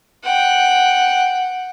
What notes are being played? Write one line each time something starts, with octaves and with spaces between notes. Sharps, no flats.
F#5 G5